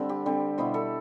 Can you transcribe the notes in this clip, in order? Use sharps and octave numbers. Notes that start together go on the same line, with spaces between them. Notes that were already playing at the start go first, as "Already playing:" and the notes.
Already playing: D3 G3 C4
G4
D3 G3 C4
B2 B3 E4 C5
A4